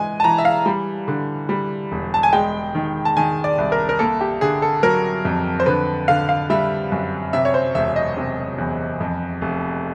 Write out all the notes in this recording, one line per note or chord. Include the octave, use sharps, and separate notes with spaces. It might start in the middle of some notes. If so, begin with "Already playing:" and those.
Already playing: E3 G#3 G#5
A5
E3 A#5
E5
F5
G3
D3
G3
E1
A5
G#5
G#3 G5
D#3
A5
D#3 G#5
D5
C2
A#4
A#4
A#3 A4
G4
D3 G#4
A4
F#3 A#4
F2
C5
D3 B4
D3 F5
F5
G3 E5
F#2
C3 E5
C#5
C5
E1 E5
D#5
C3
E2
F2
F1